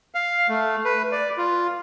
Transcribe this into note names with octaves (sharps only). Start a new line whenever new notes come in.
F5
A3
B4
D5
F4